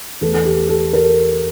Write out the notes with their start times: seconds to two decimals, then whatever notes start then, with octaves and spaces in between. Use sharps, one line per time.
0.21 E2 E3 A3 A4
0.34 A4
0.45 G4
0.69 A4
0.93 A#4